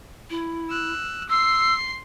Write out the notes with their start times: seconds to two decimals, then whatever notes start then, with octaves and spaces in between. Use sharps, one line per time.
0.30 E4
0.70 E6 F#6
1.29 C6 E6 C7